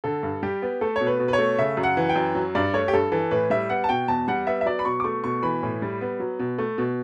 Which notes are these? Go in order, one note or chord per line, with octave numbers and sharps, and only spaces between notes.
D3 A4
G2
G3 G4
B3
A3 A4
C#5
B2
B4
B2
B4
C#5
A3
C#3 E5
F#2
F#5
E3
G5
F#2
F#3
G2 D5
A3 C#5
G4
G2 A4
E3 A4
A2 B4
G3 E5
B3 F#5
A5
B2 G5
E2 A5
G3 F#5
B3 E5
E5
F#3 D5
B5
B2 C#6
D6
A3 C#6
B2 C#6
E3 B5
A2
G3
B3
F#3
B2
A3
B2